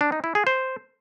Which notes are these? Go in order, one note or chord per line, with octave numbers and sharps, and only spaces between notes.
D4
D#4
E4
G#4
C5